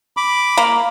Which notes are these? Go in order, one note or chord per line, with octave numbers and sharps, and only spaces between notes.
B5 D6
A#3